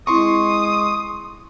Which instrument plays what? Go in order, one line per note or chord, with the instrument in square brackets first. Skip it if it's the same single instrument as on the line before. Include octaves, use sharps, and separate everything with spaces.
[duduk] G#3 [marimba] C4 E4 [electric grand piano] C6 C#6 [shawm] D#6